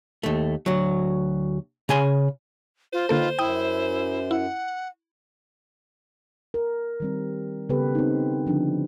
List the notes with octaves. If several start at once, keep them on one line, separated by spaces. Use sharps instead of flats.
D#2 A3
D2 F#3
C#3 G#4 G#5 C6
F4 C5
D3 D#3 A#3 F4 A4 B4
F#2 E4 G5 D#6
E4 F#5
A#4
D#3 G3 C4
C#3 B3 G4 A4 B4
C4 D#4
D3 F3 D4